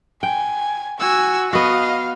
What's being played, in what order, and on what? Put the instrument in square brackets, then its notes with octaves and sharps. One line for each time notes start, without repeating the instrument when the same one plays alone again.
[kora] G5 [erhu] G#5
[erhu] F#4 [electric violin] G#5 E6
[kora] B3 F#4 [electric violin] D#5 [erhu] F5